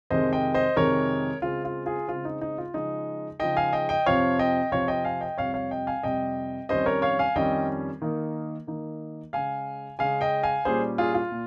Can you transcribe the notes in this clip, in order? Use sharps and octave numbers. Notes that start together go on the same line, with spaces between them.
F2 C3 D#3 G#3 C5 D#5
D#5 G5
C5 D#5
F2 C3 D#3 G#3 A#4 C#5
C#3 G#3 C4 F4
F4
F4 G#4
C#3 G#3 C4 F4
D#4
D#4
F4
C#3 F3 G#3 D#4
C#3 F3 G#3 D#4 D#5 G5
F5 G#5
D#5 G5
D#5 G5
F2 C3 F3 C4 C#5 F5
D#5 G5
F2 C3 F3 C4 C#5 F5
D#5 G5
F5 G#5
D#5 G5
F2 C3 G3 C#5 F5
C#5 F5
D#5 G5
F5 G#5
F2 C3 G3 D#5 G5
F2 D#3 G3 C#4 C5 D#5
A#4 C#5
C#5 F5
F5 G#5
F2 D#3 G3 C#4 D#5 G5
D#3 A#3 D#4
D#3 A#3 D#4
C#3 G#3 C#4 F5 G#5
C#3 G#3 C#4 F5 G#5
D#5 G5
F5 G#5
A#2 G3 C#4 G#4 C5
F4 G#4
F4
A#2